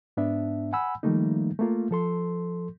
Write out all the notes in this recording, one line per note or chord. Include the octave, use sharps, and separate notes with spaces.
G#2 B3 D4 E5
F#5 G#5 B5 E6
D#3 F3 G3 A3 A#3 D#4
A3 A#3 F4
F3 A4 C6